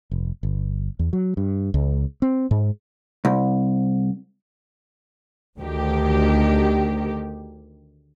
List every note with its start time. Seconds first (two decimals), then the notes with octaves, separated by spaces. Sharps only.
0.11 F1
0.43 G1
0.99 E2
1.13 F#3
1.37 G2
1.74 C#2
2.22 C4
2.51 G#2
3.25 C2
5.59 D2 D#3 G4